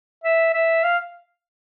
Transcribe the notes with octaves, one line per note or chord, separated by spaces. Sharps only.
E5
E5
F5